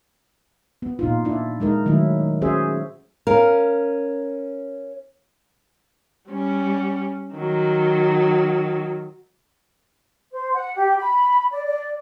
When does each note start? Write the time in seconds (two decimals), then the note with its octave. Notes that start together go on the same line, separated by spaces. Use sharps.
0.82 B3
0.99 A#2 D#4 F4
1.25 D4 E4
1.60 G#3 D#4 A#4
1.86 D#3 F#3 A3 E4
2.41 C#4 F#4 G#4 C5 E5
3.27 C#4 A#4 F5
6.28 G3 C#4
7.34 D#3 F#3
10.32 C5
10.53 F#5
10.75 G4
10.98 B5
11.50 D5
11.65 D5